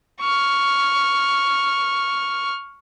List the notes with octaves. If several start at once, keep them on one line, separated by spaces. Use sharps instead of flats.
C#6 F6